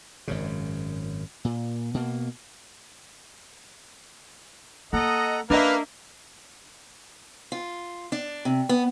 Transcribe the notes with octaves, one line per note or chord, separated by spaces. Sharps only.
G#1 F#2 C#3
A#2
B2 A#3
A#3 A4 D#5 F#5 A#5
A#3 C#4 D4 B4 D#5 E5 F6
F4
D4
C3
B3